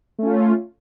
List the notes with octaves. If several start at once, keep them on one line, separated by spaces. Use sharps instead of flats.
A3 C#4 F4